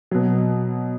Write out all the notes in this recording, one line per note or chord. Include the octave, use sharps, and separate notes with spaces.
B2 F#3